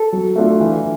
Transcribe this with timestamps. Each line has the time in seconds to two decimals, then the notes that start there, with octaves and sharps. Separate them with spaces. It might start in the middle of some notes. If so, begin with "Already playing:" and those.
Already playing: A4
0.13 F#3
0.36 A3 D4 F4
0.60 E3